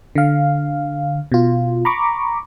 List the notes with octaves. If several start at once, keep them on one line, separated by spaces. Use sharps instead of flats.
D3 F5
B2 F4
A#5 B5 C#6 D6